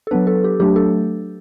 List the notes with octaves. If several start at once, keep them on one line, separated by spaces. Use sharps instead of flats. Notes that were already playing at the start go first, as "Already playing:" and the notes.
A4
F#3 B3 D4 B4
A4
G4
F#3 A3 D4 G4
A4